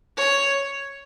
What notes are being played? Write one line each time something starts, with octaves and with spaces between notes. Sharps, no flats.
C#5